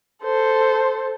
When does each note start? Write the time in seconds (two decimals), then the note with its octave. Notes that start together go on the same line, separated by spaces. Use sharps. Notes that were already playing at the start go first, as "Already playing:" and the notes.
0.24 A4 C5